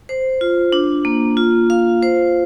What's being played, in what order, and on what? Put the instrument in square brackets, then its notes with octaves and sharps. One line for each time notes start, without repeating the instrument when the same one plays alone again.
[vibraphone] C5
F4
D4
A#3
F4
F5
C5